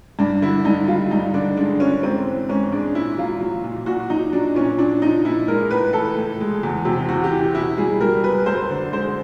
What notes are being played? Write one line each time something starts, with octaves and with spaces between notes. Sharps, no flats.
G2 D4
D3 E4
G2 D#4
G3 F4
G2 D#4
D3 D4
G#3 D4
F3 C#4
G#2 C4
E3
G#2 C#4
G#3 D4
A#2 E4
F#3 F4
F#3
A#2
A#2 F#4
F#3 D#4
F#3 D4
A#2 C#4
A#2 D4
F3 D#4
A#2 E4
G#3 A#4
A2 B4
E3 A4
A2
G#3
E2
C3
E2 F#4
G4
E3
B2 E4
G3 G#4
G3 A#4
B2 B4
F#2 C5
D3
G#3 C5